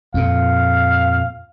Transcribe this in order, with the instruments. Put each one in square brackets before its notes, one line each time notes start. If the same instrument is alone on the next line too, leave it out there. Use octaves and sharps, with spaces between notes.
[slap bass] F2 A#2 [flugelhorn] F5